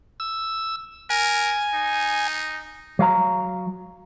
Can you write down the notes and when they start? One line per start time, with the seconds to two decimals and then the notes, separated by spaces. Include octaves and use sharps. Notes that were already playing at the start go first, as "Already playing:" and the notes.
0.20 E6
1.10 A#4 G#5
1.75 D#4
2.99 F#3 F5 A#5